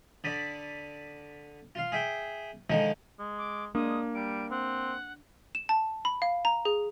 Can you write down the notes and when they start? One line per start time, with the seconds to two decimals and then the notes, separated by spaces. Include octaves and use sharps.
0.24 D3 D5 B5 D#6
1.75 F4 F5
1.92 G#4 E5 G5
2.70 D3 D#3 F3 G#3 D#4
3.19 G#3
3.38 D6
3.75 G#3 A#3 D4 D#6
4.15 G3 D7
4.51 C4 F#5
5.55 E7
5.69 A5
6.05 B5
6.22 F5
6.45 A#5
6.65 G#4